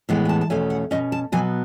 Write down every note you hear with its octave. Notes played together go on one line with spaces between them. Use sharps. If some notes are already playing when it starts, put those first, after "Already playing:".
A2 E3 G#3 B3 G#5
G#5
A5
A5
E2 B2 A3 C#4 G#5
F#5
B2 F#3 C#4 D#5
A5
B2 F#3 B3 G#5